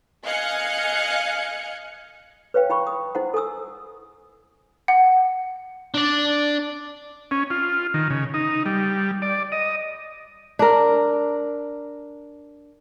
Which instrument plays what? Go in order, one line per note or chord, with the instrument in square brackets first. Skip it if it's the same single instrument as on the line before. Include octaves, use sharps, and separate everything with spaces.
[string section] D#5 F5 G#5 F#6 G#6 C#7
[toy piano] B4 C#5 F5 G5
E4 G5 B5 C#6
D#6
E4 C5 F#5
A4 G#5 D#6 E6
[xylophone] F#5
[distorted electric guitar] D4 D5
[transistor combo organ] C#4
F4
D#3
C#3
D#4
G3
D5
D#5
[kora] D4 A#4